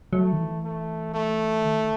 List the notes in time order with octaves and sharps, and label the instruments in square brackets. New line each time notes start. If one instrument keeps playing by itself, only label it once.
[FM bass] F#3 [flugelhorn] A3
[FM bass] D#3
E3
[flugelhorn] A3
A3
[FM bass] D#3